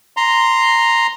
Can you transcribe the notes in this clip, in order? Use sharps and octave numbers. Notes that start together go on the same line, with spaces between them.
A#5 C6